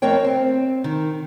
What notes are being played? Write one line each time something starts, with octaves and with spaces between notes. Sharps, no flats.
F2 A3 C4 A#4 C#5 G5
C4
D#3